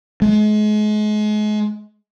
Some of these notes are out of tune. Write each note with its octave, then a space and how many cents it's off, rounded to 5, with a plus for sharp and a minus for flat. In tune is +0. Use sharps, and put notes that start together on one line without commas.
G#3 +35